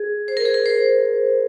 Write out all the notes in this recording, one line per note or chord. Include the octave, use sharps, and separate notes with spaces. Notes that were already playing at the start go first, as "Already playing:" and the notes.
Already playing: G#4
C5
A#4
G#4
A#4
C5